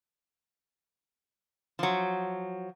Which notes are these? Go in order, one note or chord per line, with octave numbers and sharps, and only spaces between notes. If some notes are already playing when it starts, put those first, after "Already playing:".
F3 F#3